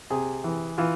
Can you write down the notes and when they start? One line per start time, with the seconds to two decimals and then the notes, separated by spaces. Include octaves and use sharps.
0.10 C3 G#4
0.44 E3
0.78 E3 F4